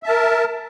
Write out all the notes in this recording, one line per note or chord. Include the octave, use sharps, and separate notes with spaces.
A#4 E5 A5